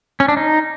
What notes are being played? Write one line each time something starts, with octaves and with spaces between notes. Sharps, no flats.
C#4
D4
D#4